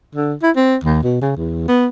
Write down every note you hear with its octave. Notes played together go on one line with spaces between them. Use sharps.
D3
E4
C4
D#2
B2
C#3
E2
B3